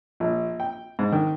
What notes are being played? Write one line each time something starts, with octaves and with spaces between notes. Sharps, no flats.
A#1
G5
G#2
D#3